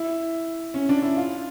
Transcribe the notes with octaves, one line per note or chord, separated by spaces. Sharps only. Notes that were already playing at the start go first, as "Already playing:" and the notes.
Already playing: E4
C#4
D4
E4
F4